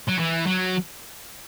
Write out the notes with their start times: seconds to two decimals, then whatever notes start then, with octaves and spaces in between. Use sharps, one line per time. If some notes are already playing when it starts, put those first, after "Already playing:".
0.08 F#3
0.19 E3
0.46 F#3